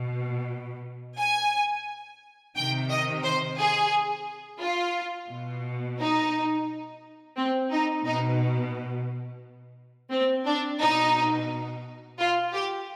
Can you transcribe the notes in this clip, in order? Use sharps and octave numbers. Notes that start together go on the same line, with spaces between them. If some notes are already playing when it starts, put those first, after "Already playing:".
Already playing: B2
G#5
C3 D#3 G5
D#5
C5
G#4
F4
B2
D#4
C4
D#4
B2 D#4
C4
D4
B2 D#4
F4
G4